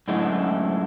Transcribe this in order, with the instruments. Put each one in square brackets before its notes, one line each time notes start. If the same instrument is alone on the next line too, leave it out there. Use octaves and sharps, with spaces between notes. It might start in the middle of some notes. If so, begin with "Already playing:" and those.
[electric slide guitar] F#2 A2 D3 G#3 E4